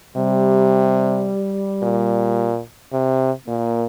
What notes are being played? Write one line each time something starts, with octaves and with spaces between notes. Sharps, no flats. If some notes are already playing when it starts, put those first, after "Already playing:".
C3 G3
A#2
C3
A#2 A#3